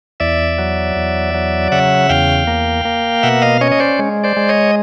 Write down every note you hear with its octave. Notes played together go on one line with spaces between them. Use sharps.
E2 D5 E5
F#3
E2
F#3
C#3 E5 F#5
E2 F5 G5
A#3
A#3
B2 E5 F#5
D#5 F5
C#4 C#5 D#5
D#5
C5 D5
G#3
C5 D5
G#3
C#5 D#5